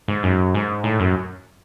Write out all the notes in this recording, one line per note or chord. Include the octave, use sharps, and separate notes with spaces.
G#2
F#2
G#2
A2
F#2